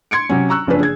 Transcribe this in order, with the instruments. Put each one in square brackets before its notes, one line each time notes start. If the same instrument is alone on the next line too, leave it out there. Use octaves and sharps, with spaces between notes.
[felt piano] C6 G#6 C#7 D7
C3 F#3 C#4
A#5 C#6 E6 F#6
F#1 C#3 F3 C#4 D4 B4
G#4 G#6